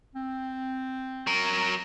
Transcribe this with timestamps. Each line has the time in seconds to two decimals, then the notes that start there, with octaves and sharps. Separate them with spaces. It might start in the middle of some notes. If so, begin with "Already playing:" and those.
0.15 C4
1.27 F#3 A#4